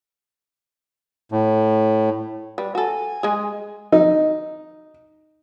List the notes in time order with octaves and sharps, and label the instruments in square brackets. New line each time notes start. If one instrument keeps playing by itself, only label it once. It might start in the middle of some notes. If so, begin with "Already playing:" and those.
[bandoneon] A2
[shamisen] G3 [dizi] B4
[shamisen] F#4 A4 [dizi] G#5
[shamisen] G#3 G#4
[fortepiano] D#4